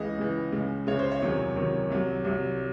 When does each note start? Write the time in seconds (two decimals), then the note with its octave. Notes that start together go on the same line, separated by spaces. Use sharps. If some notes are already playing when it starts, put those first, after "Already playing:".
Already playing: C#2 C#3 E3 D#5
0.19 C#2 C#3 E3
0.52 C#2 C#3 G#3
0.87 C#2 C#3 G#3 C#5
0.99 C5
1.11 C#5
1.22 E2 C3 D#3 F#3
1.56 E2 C3 D#3 F#3
1.90 C2 C3 F#3
2.25 C2 C3 F#3